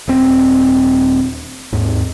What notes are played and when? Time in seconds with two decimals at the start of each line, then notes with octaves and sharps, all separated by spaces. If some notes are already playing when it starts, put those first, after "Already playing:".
0.08 D#1 C4
1.72 D#2 G#2